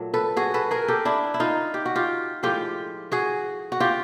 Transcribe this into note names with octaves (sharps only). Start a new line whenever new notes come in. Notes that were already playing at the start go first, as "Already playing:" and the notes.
Already playing: A#2 F#3 A3
A4 B4
F#4 G#4
A4 B4
G#4 A#4
G4 A4
D4 E4
E4
D#4 F4
G4
F#4
F4 G4
A2 F3 G#3 F4 G4
F#4 G#4
F#4
F4 G4